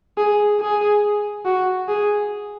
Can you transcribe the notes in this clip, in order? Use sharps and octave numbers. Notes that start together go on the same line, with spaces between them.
G#4
G#4
F#4
G#4